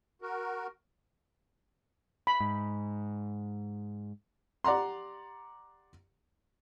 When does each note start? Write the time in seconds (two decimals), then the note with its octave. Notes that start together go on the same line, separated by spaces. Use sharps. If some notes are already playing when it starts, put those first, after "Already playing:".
0.22 F#4 A#4
2.27 B5
2.40 G#2
4.64 G4 D5 F#5 A#5 C6